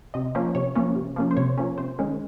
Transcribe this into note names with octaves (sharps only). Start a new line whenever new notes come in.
C3 D#5
F3 A#3 C#4
C3 C#5
F3 A#3 C#4
C3
F3 A#3 C#4
C5
C3 C#5
F3 A#3 C#4
C3 C5
D#3 G#3 C#4